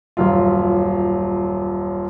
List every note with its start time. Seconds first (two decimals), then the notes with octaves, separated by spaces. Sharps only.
0.17 D#1 F#2 F4